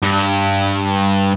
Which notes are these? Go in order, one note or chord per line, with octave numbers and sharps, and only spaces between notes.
G2